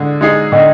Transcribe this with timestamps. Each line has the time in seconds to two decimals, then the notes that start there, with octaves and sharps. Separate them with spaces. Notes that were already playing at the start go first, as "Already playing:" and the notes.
Already playing: D3 G#3
0.21 G#3 D#4 G#4
0.52 D3 D#5 G5